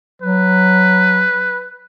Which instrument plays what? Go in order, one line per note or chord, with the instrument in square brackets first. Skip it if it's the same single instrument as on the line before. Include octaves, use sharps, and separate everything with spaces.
[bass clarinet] F#3 [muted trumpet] B4